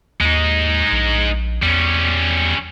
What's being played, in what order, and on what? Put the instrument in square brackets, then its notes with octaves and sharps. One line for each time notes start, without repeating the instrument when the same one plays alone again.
[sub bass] D#2 [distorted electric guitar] G#3 D#4
[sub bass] A#1
[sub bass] E2 [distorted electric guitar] G3 C#4